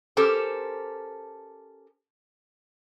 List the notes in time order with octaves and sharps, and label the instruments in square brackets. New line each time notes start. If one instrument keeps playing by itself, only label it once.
[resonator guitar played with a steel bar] C#4 G4 A4 A#4 C5